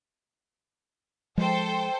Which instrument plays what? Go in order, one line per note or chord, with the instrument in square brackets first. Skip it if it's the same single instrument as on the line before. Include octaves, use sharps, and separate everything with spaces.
[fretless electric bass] F3 G#3 [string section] A4 C5 G5